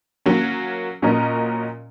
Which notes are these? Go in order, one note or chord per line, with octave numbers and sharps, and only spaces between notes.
F#3 A#3 C#4
A#2 F#3 C#4 A#4 D#5